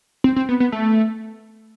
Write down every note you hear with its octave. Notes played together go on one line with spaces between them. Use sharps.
C4
C4
B3
B3
A3